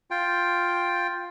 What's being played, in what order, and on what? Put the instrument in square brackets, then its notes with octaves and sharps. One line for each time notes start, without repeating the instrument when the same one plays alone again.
[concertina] F4 G5